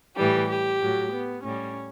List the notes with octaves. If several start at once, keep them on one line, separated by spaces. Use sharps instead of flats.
A2 E3 G3 G4
G4
A2 F#3
B3
A2 G3 C#4